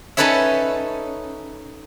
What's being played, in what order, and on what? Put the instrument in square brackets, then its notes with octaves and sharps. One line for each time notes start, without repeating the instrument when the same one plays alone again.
[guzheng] C#4 D#4 A4 B4 C#5 E5